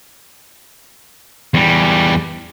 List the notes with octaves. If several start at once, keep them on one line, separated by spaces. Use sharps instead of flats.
E2 G3